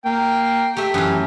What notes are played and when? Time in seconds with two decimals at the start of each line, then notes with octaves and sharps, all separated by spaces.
0.05 A#3 G5
0.77 A3 G4 E5
0.94 F#2 E3